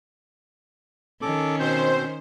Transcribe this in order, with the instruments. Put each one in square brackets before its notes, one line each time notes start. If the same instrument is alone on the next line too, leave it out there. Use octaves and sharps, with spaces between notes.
[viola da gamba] D#3 C#4 [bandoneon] A4 D6
[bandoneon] B2 C4 G6 [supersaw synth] C5